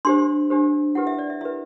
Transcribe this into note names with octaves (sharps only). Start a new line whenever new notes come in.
D4 G4 C5 C6
D4 G4 C5
E4 G4 B4 F#5
E5
D5
E5
E4 G4 B4 E5